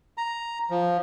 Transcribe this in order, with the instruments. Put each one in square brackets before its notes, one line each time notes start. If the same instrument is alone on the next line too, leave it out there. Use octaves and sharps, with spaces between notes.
[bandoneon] A#5
F3